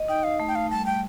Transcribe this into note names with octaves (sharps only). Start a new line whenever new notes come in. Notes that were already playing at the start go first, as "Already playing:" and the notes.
Already playing: D#5
D#4 G5
F5
A3
G5
F5
G3 A5
G5